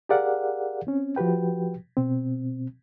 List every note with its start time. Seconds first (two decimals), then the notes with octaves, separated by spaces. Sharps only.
0.09 G4 G#4 A#4 D5 F5 F#5
0.87 C4 C#4
1.16 F3 F#4 G4 B4 G5
1.97 B2 C4